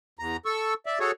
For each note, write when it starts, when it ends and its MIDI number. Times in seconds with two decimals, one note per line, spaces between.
0.19 0.37 40
0.19 0.37 82
0.46 0.74 69
0.46 0.74 85
0.46 0.74 88
0.86 0.99 74
0.86 0.99 76
1.00 1.11 66
1.00 1.11 68
1.00 1.11 69
1.00 1.11 73